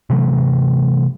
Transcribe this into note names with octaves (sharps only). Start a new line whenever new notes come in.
C3 E3 F#3 A3